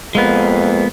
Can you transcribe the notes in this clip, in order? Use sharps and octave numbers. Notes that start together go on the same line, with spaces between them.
F2 G#3 A#3 B3